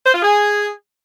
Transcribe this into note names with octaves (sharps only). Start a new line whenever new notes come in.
C5
F4
G#4